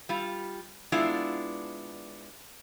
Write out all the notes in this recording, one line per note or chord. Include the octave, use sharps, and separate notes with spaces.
G3 F4
G#3 B3 D4 E4 F4 D5